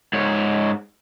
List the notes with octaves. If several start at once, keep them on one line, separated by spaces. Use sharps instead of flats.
G#2 C#5